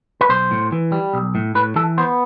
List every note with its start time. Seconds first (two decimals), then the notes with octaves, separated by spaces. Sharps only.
0.21 B4
0.29 B1 C5
0.51 A2
0.72 E3
0.92 G3
1.14 B1
1.35 A2
1.55 A2 B4
1.76 E3 A4
1.98 B3 C5